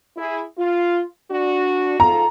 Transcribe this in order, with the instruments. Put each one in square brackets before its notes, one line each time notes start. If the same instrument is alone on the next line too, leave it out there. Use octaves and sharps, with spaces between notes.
[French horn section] E4 G#4
F4
D4 F#4
[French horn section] G#2 F4 A4 [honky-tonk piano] A#5